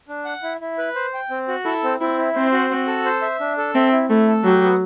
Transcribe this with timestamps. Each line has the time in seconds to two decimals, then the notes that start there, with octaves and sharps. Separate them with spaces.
0.09 D4
0.25 F#5
0.43 E4
0.61 E4
0.78 B4
0.95 C5
1.14 G5
1.30 C4
1.48 F#4
1.65 E4 A4
1.83 C4
2.00 C4 E4
2.18 E4
2.35 C4 C5
2.52 F#4
2.70 F#4
2.87 A4
3.05 C5
3.22 E5
3.40 D4
3.58 A4
3.74 C4 E5
3.92 E4
4.10 A3 E4
4.27 A4
4.44 F#3 G4
4.63 B3